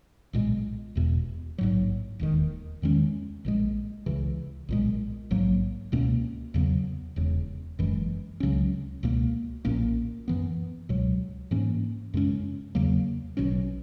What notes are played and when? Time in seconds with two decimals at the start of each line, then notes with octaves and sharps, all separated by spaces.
0.33 B1 A#2 G#3
0.95 E1 E2 B2
1.58 A#1 G#2 F#3
2.19 E1 D#2 D#3
2.82 E2 D#3 G#3 C#4
3.45 A#1 A#2 G#3
4.06 C#2 C#3 E3
4.69 B1 A#2 G#3
5.30 A#1 G#2 F#3 A#3
5.92 C#2 B2 A#3 C#4
6.54 E2 C#3 F#3 B3
7.16 E1 E2 C#3
7.79 F#1 F#2 E3 G#3
8.40 C#2 C#3 F#3 C#4
9.03 C#2 B2 A#3
9.65 A#1 A#2 A#3 C#4
10.28 F#2 E3 B3
10.89 C#2 B2 F#3
11.51 G#2 E3 A#3 C#4
12.14 F#2 C#3 G#3 C#4
12.75 E2 C#3 F#3 A#3
13.37 B1 B2 F#3 C#4